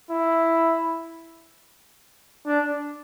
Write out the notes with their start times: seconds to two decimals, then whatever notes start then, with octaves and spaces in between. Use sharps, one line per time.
0.11 E4
2.47 D4